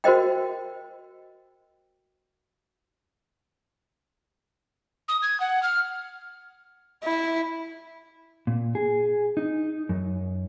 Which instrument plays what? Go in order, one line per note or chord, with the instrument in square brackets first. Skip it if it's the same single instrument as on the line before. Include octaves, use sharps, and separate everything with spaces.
[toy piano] F#4 A#4 C5 D#5 G5
[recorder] D#6
G#6
F#5
F6
[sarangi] E4
[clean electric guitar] A#2
G#4
D#4
F#2